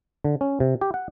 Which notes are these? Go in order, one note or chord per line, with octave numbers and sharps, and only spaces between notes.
D3
C#4
C3
G4
F#5